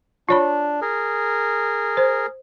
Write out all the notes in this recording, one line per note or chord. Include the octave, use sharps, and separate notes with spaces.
D4 F4 C#5 B5
G#4 A#4
C5